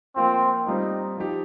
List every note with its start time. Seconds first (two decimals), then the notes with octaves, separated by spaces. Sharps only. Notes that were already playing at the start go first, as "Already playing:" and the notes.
0.16 F3 A#3 C4 F4
0.66 G3 C4 D#4 F4
1.18 F3 D#4 G4